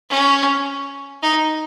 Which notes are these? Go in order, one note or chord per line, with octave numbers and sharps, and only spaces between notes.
C#4
D#4